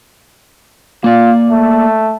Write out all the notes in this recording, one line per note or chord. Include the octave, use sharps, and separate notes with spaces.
A#3 F4 D5
A3